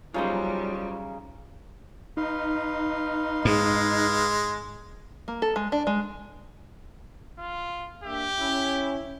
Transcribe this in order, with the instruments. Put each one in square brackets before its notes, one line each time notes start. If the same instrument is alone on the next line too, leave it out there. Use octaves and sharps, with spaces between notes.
[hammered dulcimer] C#3 D#4 [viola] F#3 G3 [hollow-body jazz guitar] F4 G#4 C5
[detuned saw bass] D#4 [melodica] B4 F5 C6
[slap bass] G#2 [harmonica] G#3
[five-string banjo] A#3
A4
G#3
D4
G#3
[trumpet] F4
[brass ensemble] A#3 D4 E5 [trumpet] G4
[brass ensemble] C#4 E4